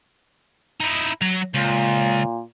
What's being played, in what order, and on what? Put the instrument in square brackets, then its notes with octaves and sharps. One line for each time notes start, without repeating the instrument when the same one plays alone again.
[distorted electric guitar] D#4 E4
F#3 A#5
[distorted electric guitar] C#2 [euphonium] A#2